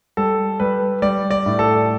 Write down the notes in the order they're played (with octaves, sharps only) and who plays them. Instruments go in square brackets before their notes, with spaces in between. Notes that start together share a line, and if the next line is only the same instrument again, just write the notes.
[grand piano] G3 A4
G3 B4
G3 D5
D5
A2
A4